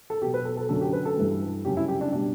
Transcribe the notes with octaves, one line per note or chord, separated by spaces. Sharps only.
A4
B2 F#3 G4
B4
A4
A4
F#2 D3 F#3 A4
G4
B4
A4
G2 E3 G3
F#2 C#3 G3 G4
E4
G4
D4
B2 G3 D4